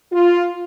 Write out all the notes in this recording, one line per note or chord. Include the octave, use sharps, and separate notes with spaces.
F4